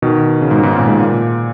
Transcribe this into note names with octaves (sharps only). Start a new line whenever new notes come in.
B2 D#3
C#3
G#2 B2
C#3
G#2 B2
A#2
G#2
A#2